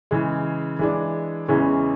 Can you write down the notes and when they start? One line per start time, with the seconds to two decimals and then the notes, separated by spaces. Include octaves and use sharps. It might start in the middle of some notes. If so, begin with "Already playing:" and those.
0.11 C#3 E3 G#3
0.79 E3 G#3 D4
1.48 E2 C#3 E3 G#3 C#4